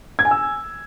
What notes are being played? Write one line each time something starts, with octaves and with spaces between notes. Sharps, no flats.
G#6
G#5
E6